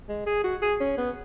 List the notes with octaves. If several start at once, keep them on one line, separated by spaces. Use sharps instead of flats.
G#3
G#4
F#4
G#4
C#4
B3